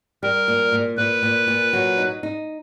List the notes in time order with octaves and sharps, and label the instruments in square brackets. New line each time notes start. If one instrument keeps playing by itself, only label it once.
[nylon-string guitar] G3 [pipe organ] A#4
[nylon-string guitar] A#2
A#2
[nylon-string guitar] A#2 [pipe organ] B4
[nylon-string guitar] A#2
A#2
F#3
D#4
D#4